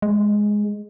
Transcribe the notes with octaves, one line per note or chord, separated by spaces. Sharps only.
G#3